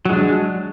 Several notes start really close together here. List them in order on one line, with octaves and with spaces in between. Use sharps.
F#3 G#3 D4